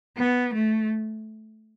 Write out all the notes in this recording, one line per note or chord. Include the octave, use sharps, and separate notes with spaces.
B3
A3